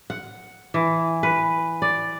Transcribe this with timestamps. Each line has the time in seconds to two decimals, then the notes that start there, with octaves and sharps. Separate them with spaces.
0.10 F#5
0.74 E3
1.23 B4
1.82 D5